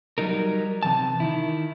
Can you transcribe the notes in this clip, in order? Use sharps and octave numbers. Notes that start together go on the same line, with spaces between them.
F#3 G3 D#4 A#4
C3 E3 A5
D#3 E4